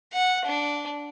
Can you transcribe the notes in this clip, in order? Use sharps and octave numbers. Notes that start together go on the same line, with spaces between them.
F#5
D4